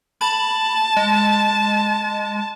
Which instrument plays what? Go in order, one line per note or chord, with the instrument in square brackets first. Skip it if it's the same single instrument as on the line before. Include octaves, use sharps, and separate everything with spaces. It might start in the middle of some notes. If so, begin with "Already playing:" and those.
[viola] A5 [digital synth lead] B5
[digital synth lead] G#3